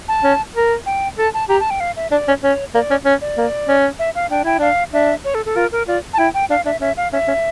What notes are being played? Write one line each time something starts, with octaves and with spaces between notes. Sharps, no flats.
A5
C#4
A#4
G5
A4 A5
A5
G4 A#5
A5
G5
F5
E5
D4 D5
C#4
C#4 C#5
A#3 D5
C#4
C#4
D5
A#3
C#4
E5
F5
D4 G5
E4 G5
D4 F5
D4 E5
C#5
A4
A4
F4 A#4
A#4
F4 D5
A5
E4 G5
G5
D4 F5
D4 E5
C#4 E5
F5
C#4 E5
C#4